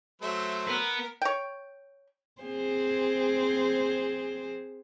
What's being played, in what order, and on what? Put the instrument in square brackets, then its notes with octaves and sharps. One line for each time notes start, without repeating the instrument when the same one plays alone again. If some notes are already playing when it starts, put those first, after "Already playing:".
[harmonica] F#3 A3 C5 [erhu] E5
[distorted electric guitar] B3 B4 [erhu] A#4
[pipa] C#5 G5
[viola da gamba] C4 G#4 C5